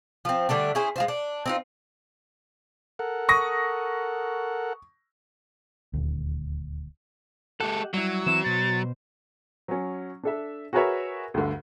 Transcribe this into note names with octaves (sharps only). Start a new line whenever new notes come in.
F3 C4
D3 G3 A3 D4
C#4 E4 G#4 C5
G#3 F4 C5
D4
C4 D#4 F4
A4 A#4 F#5
C#6 D#6 A#6
D#1 D2
G#3 G4 A4 F#5
F#3 G3 E4
E3 C4 E4 E7
B2 C5 A6
F#3 C#4
D4 A4 E5
F#4 G#4 A#4 B4 C#5 E5
D2 G2 D3